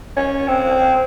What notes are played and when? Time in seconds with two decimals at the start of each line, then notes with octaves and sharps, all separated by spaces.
0.17 C#4
0.48 C4